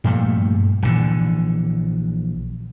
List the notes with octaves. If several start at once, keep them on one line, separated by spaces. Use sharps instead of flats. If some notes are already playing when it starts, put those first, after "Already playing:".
G2 A#2 F3 A3
A#1 D3 E3